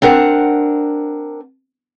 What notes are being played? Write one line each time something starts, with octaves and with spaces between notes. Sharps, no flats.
C4 D4 A#4 F#5